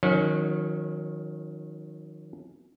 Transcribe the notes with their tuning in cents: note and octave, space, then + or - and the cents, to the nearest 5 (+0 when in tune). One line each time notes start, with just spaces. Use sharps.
D#3 +0 F#3 -35 C#4 +10